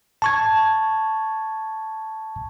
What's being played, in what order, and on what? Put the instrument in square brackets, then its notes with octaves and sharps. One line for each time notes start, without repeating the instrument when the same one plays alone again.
[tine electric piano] A5 C#6 G#6